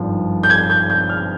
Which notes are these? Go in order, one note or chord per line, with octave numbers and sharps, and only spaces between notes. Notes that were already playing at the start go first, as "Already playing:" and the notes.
Already playing: G#1 G2 F3
G6
G#6
G6
G6
F6